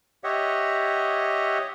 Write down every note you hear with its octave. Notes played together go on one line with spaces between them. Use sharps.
G4 C#5 D#5 E5 F#5